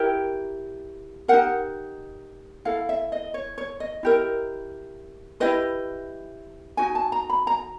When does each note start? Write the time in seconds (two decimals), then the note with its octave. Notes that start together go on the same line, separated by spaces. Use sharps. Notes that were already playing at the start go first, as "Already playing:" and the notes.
Already playing: E4 G4 A#4 G5
1.28 D#4 G4 A#4 F#5
2.65 E4 A4 F5
2.89 E5
3.12 D#5
3.34 C#5
3.58 C#5
3.80 D#5
4.03 E4 G4 A#4
5.40 E4 G4 B4 D#5
6.77 D#4 F#4 G#5
6.95 A5
7.12 A#5
7.30 B5
7.47 A#5